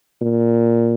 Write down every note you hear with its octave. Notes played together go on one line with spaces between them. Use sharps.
A#2